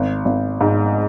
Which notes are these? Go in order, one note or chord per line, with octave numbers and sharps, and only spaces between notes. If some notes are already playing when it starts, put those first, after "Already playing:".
Already playing: G#1
G#1
G#2